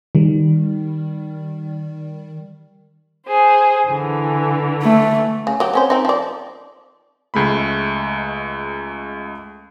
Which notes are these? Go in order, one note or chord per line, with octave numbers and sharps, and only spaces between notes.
D#3 G3
G#4 C5
D3 E3
A3
C#3
F#3 G4
C4 C#4 C5
C4 D#4
F3 D5
C#2 G#3 A3 B5